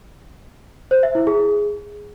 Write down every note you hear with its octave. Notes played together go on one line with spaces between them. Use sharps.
C5
E5
E4
G#4